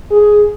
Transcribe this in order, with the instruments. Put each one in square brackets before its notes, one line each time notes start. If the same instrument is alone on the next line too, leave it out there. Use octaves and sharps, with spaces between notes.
[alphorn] G#4